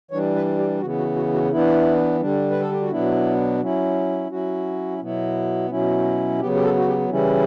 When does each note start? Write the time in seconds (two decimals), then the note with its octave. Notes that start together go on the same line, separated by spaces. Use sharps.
0.11 E3 G3 D4 C#5
0.35 B4
0.59 G4
0.81 C#3 E3 B3 F#4
0.98 F#4
1.16 F#4
1.34 F#4
1.51 E3 B3 D4 E4
2.20 D3 G3 D4
2.51 B4
2.60 A4
2.71 G4
2.81 F#4
2.91 B2 F#3 B3 D4 E4
3.60 F#3 C#4 E4
4.30 F#3 C#4 E4 F#4
5.01 B2 F#3 B3 E4
5.70 B2 F#3 C#4 E4
6.40 C#3 F#3 B3 G4
6.55 G4
6.63 A4
6.77 F#4
6.87 G4
7.09 C#3 E3 G3 C#4 E4